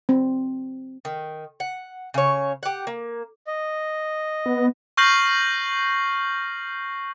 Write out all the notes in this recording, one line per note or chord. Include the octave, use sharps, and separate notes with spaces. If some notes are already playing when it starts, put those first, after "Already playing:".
C4
D#3
F#5
C#3 C#5
G4 F#5
A#3
D#5
B3
C#6 F6 G6 A#6 C7 F#7